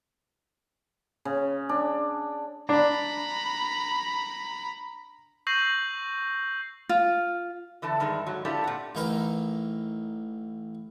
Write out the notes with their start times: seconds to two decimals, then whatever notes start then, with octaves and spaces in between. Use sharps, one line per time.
1.25 C#3
1.69 D4
2.69 D4 A#5 B5
5.47 C#6 E6 G6 A#6 C7 F#7
6.89 F4
7.82 D3 E3 A4 A5
8.00 G2 D#3 G#3 A4
8.26 G#2 F#3
8.45 C4 D4 E4 F4 G4 A4
8.64 A#2 F#5
8.95 A1 E3 D#4 A#4 B4